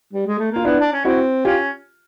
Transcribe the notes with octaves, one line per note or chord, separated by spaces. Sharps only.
G3
G#3
A3
A#3 F4
B3 D4 E4
D4
C#4
C4 E4 F#4
C#4 F4 G4